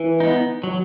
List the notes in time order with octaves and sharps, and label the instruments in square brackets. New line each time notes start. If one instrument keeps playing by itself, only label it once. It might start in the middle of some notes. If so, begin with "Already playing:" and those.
Already playing: [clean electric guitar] E3
[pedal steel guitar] B3 D#4
F#3